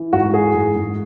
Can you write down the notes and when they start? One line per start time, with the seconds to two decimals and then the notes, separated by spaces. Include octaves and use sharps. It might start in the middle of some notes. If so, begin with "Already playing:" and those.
Already playing: E3
0.13 G#2 F#4
0.34 E3 G#4
0.55 G#2
0.76 G#2